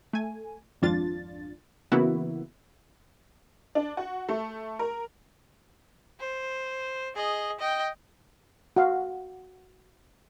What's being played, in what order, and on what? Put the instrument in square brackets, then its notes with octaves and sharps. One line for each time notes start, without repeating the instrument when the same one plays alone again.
[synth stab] A3 G#5
G#1 F2 D4 F4 A6
C#3 E3 A#3 B3 E4 F#4
[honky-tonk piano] D4
F#4
A3
A#4
[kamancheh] C5
G#4 D#5
D#5 G5
[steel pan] F#4 F5